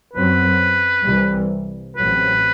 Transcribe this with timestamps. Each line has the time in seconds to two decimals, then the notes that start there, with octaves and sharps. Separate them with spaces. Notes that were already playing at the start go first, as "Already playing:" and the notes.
0.13 F#2 F#3 C4 B4
1.06 C2 C3 E3 G3
1.97 A1 A2 F#3 C4 B4